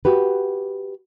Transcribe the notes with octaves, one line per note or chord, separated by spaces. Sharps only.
F#4 G4 B4